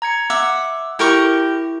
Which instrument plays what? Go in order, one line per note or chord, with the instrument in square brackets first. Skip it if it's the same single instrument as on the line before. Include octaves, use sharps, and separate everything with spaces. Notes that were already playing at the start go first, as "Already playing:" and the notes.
[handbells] A#5 G#6 C#7
[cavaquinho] E5 F#5 [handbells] D6
[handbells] E4 [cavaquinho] G4 A#4 C#6